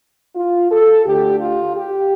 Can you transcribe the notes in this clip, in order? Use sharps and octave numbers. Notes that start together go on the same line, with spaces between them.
F4
A4
D2 D3 A3 G4
F4
G4